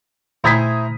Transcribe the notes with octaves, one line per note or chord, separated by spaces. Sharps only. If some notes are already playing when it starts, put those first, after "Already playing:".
A#2 A3 E4 C5 G#5 A#5 D#6 B6